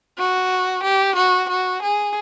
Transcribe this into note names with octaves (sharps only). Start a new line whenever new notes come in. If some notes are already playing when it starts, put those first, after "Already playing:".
F#4
G4
F#4
F#4
G#4